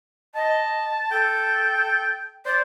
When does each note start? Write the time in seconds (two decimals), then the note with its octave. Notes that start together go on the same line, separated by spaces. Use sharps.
0.35 D#5 A5
1.11 A4 G5
2.45 C5 D5